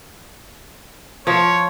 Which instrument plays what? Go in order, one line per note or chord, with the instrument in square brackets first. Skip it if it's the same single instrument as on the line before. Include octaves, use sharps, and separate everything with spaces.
[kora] F3 [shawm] C#5